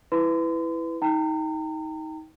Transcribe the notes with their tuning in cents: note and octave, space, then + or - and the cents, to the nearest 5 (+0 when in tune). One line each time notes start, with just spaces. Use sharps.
E4 +0 B4 +10 C6 -40
D#4 +25 G5 +0 A#5 -35